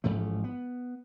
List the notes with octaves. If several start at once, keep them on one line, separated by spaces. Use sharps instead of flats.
A1 G#2 F3 A3
B3